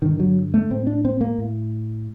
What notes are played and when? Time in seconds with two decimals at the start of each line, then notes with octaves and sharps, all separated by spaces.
0.02 G2 D3 D#3
0.20 F#3
0.54 A3
0.70 A2 C4
0.87 D4
1.05 C4
1.21 A#3
1.38 A2